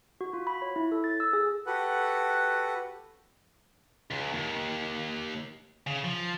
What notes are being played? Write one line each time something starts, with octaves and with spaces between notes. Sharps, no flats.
F#4
F4
B5
C#5
E4
A4
A6
E6
G#4
F#4 G4 A4 B4 F#5
C#2
D#2
C#3
F3